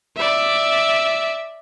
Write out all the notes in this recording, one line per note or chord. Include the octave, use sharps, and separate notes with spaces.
D5 E5